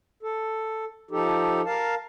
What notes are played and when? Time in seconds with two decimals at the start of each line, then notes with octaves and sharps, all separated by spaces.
0.23 A4
1.11 F3 D#4 G4 A4
1.66 A#4 F5 A5